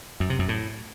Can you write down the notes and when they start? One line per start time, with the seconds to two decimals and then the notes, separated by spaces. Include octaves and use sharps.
0.20 F#2
0.30 C3
0.39 F#2
0.49 A2